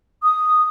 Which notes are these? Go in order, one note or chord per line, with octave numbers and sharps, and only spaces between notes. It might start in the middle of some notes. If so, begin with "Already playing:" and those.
D#6